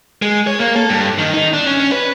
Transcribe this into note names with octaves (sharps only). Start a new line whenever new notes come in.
G#3
C#5
A#3
A4
G2
D#3
D#4
D4
C#4
B4